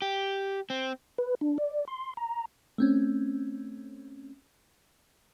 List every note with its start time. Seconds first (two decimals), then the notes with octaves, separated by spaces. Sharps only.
0.02 G4
0.70 C4
1.18 B4
1.41 D4
1.58 D5
1.88 C6
2.17 A#5
2.78 A3 C4 C#4